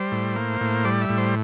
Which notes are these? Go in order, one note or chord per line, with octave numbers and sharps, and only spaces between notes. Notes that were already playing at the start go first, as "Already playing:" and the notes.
Already playing: G3 C5
A2
A#3
A2
G3 D5
E5
A2
C5